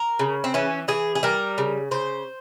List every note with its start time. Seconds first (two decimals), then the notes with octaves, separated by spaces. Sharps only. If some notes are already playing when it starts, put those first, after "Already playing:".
Already playing: A#4
0.19 C#3
0.44 C4
0.54 E3 C#4
0.88 E3 G#4
1.15 G#4
1.23 G3 A#4
1.58 C#3
1.91 C#3 C5